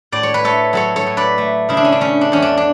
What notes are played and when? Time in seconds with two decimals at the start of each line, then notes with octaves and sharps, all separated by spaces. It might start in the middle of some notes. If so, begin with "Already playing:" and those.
0.12 A2 D5
0.23 C#5
0.34 B4
0.44 A3 A4 C#5
0.73 F#3 A4 C#5
0.96 A4 C#5
1.07 A2
1.17 B4 D5
1.38 A3
1.69 C#3 E4
1.77 D4
1.85 C#4
1.92 D4
2.01 A3 C#4
2.21 D4
2.32 E2 C#4
2.42 D4
2.57 D4